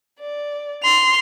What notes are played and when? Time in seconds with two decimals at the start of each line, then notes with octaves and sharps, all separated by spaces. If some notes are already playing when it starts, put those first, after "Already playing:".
0.19 D5
0.83 C6 F7